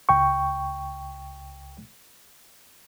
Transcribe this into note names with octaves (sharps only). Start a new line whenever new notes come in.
C#2 G5 C#6